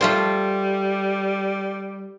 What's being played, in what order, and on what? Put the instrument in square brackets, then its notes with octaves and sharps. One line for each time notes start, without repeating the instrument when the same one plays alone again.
[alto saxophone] G3 [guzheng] A3 F4 C5